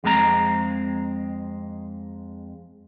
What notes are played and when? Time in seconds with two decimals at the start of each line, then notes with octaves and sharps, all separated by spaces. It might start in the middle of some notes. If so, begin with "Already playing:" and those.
0.04 F2 G#3 C4 G#4 A#5